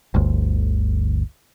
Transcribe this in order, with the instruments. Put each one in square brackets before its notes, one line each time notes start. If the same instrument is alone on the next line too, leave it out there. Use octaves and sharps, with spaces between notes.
[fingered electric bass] G1 D2